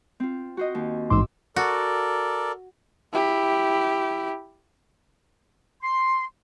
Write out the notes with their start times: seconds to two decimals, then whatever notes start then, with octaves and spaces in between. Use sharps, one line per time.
0.20 C4 F4
0.57 F#4 C5 D#5
0.75 D#2
1.10 A1 G#2 C6 D6 E6
1.56 F#4 A4 A#4 D5
3.13 E4 G4
5.81 C6